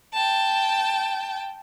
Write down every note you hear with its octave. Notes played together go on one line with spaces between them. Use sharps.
G5 A5